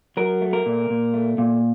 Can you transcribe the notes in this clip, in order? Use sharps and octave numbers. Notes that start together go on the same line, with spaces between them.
F#3 A#4
A3
A#4
A#2
A#2
A3
A#2